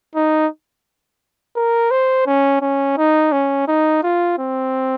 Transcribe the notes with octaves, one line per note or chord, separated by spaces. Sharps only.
D#4
A#4
C5
C#4
C#4
D#4
C#4
D#4
F4
C4